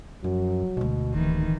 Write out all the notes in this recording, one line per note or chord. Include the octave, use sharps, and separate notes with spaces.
F#2 F3 F#3
D2 B2 G#3
D1 D#2 D#3 E3